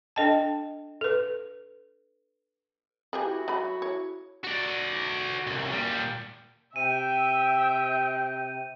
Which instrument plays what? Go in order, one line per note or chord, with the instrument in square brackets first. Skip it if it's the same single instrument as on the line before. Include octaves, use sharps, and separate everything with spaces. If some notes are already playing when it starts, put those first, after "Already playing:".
[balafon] D4 A4 D#5 G5 A5
A4 B4
[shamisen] G4 G#4 B4
[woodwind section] E4 F#4
[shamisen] F#3 B5
C#5
[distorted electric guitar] F#4 D5
C2 F#2
A#2 G3
[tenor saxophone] C3 [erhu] E5 [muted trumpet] G5 [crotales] D#7